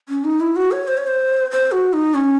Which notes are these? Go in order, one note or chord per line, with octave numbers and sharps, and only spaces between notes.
C#4
D#4
E4
F#4
C#5
C5
C#5
C5
C5
F#4
D#4
C#4